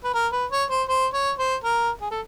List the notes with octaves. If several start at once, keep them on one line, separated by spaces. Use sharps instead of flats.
B4
A#4
B4
C#5
C5
C5
C#5
C5
A#4
G#4
A4